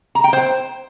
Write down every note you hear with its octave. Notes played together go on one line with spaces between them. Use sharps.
A#5
G5
C5